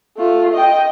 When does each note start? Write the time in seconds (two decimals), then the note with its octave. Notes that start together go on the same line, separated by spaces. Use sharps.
0.17 A3 F4
0.54 D#5 G5